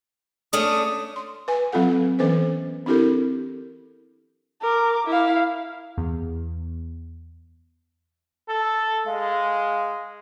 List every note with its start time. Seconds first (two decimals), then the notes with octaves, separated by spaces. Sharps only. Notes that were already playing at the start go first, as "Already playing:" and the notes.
0.53 A3 C#4 D4 D#6
1.16 C6
1.48 B4 G#5
1.72 F#3 C4 F4 A4 F#5
2.19 E3 B3 C#4 A4 B4 C5
2.86 C4 D4 E4 G4 A4 A#4
4.61 A#4 D6
5.07 E4 F5
5.98 E2
8.49 A4
9.07 G#3 F5